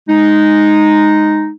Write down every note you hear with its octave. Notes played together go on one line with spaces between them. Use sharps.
G#3 D#4